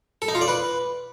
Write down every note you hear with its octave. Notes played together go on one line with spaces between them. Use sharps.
A4
D#4
F4
D5
B4